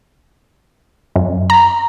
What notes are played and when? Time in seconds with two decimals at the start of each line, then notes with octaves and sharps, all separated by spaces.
1.16 F#2
1.50 A#5